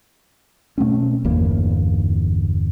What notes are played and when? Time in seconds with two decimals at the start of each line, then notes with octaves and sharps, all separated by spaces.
0.78 B2 A3 C4 C#4
1.25 G1 E2 E3 A#3